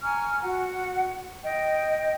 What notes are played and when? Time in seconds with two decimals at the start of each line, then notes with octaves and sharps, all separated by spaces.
0.03 G#5 A#5 C#6 F6
0.43 F#4 F#5
1.43 D#5 G5